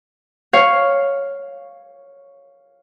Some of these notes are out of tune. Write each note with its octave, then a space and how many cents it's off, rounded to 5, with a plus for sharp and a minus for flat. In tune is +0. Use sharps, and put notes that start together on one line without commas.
C#5 +0 F5 +0